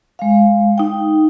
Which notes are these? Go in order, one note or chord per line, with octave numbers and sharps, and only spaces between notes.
G#3 F5
D#4 G5